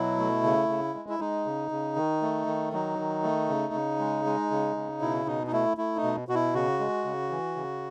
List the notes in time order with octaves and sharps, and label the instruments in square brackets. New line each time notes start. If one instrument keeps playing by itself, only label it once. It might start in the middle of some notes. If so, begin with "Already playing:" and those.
Already playing: [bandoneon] B2 F#3 E4
A3
C#3
C#3
G#3
E4
G#3 D#4
C#3
C#3
D#3
A3
D#3
F#3 D#4
D#3
A3
C#3
C#3
G#3
G#3
C#3
C#3
B2 E4
B2 D#4
D#4
A3 E4
A3 E4
D#4
B2
B2 F#4
E4
C#3 F#4
G#3
C#3
E3
C#3